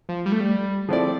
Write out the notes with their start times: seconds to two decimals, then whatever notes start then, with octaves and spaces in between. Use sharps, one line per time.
0.09 F3
0.26 G3
0.32 A3
0.40 G3
0.89 F3 C4 E4 A4 D5